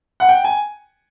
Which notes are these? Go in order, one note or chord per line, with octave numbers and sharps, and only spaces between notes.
F#5
G5
G#5